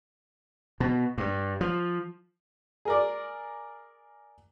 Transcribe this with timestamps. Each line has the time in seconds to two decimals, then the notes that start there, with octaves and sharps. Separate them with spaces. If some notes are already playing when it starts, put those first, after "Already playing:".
0.80 B2
1.18 G2
1.61 F3
2.85 G#4 A#4 D5